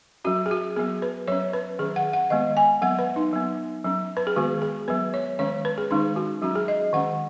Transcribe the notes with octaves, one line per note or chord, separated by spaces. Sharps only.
F#3 C#4 F#4
G#4
F#4
F#3 B3 G#4
B4
F#3 C#4 C#5
B4
D#3 F#3 C#4 G#4
F#5
F#5
D#3 G#3 B3 D#5
G#5
F#3 B3 F#5
B4
D#4
F#3 B3
F#3 C#4
B4
G#4
D#3 G#3 B3 F#4
G#4
F#3 B3 B4
C#5
D#3 G#3 C#4 C#5
B4
G#4
D#3 G#3 C#4 D#4
F#4
F#3 C#4 F#4
G#4
D#5
D#3 G#3 C#4 F#5